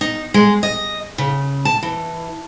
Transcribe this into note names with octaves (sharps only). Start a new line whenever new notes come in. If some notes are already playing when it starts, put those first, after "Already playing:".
D#4
G#3
D#5
C#3
A5
E3